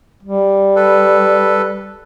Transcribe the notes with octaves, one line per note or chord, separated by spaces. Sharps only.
G3
A4 B4